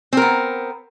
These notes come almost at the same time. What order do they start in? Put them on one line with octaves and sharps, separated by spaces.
C4 A#4 B3